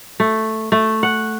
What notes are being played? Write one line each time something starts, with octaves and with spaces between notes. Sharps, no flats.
A3
A3
F#5